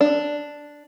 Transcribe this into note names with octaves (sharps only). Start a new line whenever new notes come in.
D4